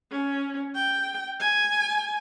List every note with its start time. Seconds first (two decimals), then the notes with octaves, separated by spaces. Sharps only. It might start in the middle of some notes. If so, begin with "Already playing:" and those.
0.11 C#4
0.75 G5
1.40 G#5